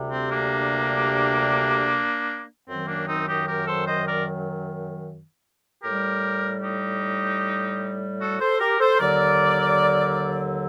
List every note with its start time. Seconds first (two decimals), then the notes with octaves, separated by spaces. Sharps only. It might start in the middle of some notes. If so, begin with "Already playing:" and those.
Already playing: D2 C3 G3
0.11 C4
0.30 A#3 D4
2.67 F#2 D#3 F#3 C4
2.87 A#3 D4
3.07 C4 D#4
3.27 D#4 G4
3.47 G4 A#4
3.66 A4 C5
3.86 C5 D#5
4.06 A#4 D5
5.83 A2 G3 G4 A#4
6.62 D#4 G4
8.20 F#4 A4
8.40 A4 C5
8.60 G4 A#4
8.79 A4 C5
8.99 D#2 D3 F#3 A#4 D5